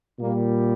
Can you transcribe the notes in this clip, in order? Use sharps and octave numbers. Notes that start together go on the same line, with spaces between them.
A#2 G3 A#3